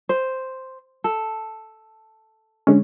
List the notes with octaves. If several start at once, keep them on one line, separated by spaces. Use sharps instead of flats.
C5
A4
D3 G#3 C#4